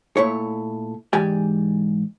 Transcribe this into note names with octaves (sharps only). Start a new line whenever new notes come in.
A#2 A3 E4 C#5
G#2 E3 G4 D5 G#5